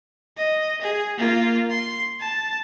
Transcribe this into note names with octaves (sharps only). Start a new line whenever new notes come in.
D#5
G#4
A#3 F4
C6
A5